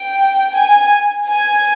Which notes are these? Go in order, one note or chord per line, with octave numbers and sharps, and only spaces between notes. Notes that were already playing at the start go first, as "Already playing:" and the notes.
Already playing: G5
G#5
G#5